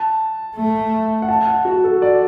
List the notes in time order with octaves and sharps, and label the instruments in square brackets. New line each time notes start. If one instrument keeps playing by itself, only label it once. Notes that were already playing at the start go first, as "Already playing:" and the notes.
Already playing: [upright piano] A5
[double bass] A3
[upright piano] F#5
A5
F#5
F#4
A4
D5